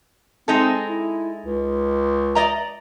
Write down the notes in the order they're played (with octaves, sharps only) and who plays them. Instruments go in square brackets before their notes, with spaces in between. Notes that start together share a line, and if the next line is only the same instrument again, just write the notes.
[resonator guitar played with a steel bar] G#3 D#4 A4 [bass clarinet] C4
[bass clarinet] E4
C#2
[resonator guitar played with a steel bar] D5 D#5 A#5